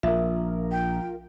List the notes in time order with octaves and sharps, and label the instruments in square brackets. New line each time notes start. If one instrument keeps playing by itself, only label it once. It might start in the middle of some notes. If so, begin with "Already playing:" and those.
[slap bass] A#1 [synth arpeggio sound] F4 A#4 [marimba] E5
[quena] G5